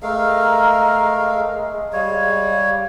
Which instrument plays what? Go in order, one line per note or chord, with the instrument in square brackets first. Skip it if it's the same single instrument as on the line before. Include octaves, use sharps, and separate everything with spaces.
[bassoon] G#3 [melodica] A3 A#4 F5 [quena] A#5
[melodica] G3 C#5 [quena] F5